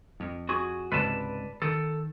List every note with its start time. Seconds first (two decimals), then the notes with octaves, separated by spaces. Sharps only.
0.20 F2
0.49 F#4 G#4
0.92 C#2 G#2 C3 B4 D5 A5
1.62 D#3 A4